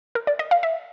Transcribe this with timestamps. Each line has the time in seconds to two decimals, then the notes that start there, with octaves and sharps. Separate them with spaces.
0.15 A#4
0.27 D5
0.39 D#5
0.51 F5
0.63 E5